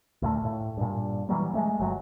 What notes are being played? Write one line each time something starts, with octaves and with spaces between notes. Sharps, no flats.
D2 A#2 A3
A2
G2 A#2
E3 F#3 G3 A#3
G#3 A3 C4
G1 F#3